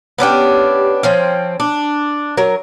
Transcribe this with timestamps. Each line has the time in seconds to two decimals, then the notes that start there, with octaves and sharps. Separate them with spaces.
0.18 B3 C#4 D4 G4
1.03 F3 C4 C#4
1.60 D4
2.37 F#3 A#4